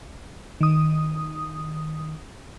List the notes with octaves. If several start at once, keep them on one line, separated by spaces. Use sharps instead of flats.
D#3 D#6